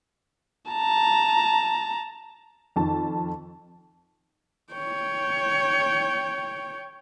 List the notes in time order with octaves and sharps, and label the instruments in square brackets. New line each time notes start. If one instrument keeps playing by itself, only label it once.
[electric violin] A5 A#5
[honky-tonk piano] F2 D#3 A5
[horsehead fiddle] C#5 G5